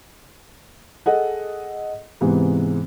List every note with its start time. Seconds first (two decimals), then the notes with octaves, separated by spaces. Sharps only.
1.06 G#4 A4 D#5 F#5
2.21 G#2 C3 E3 G#3 B3